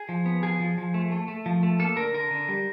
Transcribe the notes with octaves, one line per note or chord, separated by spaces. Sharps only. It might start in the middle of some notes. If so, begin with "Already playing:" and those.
Already playing: G#4
F3
B3
F3 G#4
F3
F3
A3
A3
A3
F3
A3
A#3 A4
D3 A#4
D3 A#4
D3
G3